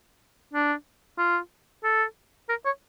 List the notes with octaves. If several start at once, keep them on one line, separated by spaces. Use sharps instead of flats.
D4
F4
A4
A#4
C#5